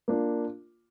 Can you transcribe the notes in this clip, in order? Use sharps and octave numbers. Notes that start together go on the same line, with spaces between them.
A#3 D4 F4